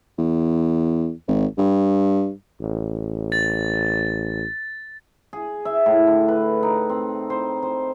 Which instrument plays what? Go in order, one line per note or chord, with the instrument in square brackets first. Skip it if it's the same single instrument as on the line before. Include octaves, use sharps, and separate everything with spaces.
[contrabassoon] E2
G#1
G2
[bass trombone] A1
[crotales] A6
[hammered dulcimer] G#4
E5
A2
D3
B4
D#4
C4
C5
C5